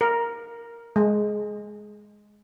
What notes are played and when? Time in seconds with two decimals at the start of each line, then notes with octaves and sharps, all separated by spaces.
0.01 A#4
0.96 G#3